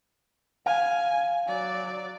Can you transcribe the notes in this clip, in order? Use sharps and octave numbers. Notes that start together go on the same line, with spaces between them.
F5 G#5
F#3 D5